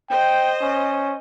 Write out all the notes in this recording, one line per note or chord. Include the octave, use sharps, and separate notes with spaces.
C5 D#5 G5
C#4